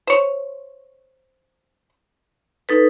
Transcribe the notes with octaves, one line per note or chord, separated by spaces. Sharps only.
C5 C#5
D#4 A4 B4